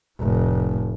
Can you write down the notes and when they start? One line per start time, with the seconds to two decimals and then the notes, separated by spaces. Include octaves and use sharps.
0.19 F1 A2